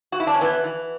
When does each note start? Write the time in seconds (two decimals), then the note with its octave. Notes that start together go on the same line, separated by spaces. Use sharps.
0.12 F#4
0.20 E4
0.27 D4
0.34 C#4
0.41 E3 B3
0.64 E3